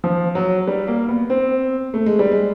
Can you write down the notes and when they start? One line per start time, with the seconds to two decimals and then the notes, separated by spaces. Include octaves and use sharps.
0.04 F3
0.35 F#3
0.68 G3
0.87 A#3
1.09 B3
1.30 C4
1.94 A3
2.06 G#3
2.19 G3
2.31 G#3